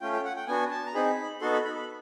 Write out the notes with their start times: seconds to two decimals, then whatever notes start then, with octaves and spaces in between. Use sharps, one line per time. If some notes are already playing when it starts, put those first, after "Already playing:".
0.01 A3 C#4 F4 G5
0.13 G5
0.25 F#5
0.36 G5
0.48 B3 D4 F#4 G#5
0.71 A5
0.86 A#5
0.94 C4 D#4 G#4 B5
1.41 B3 D#4 F#4 A4 C6
1.53 B5
1.64 B5
1.76 B5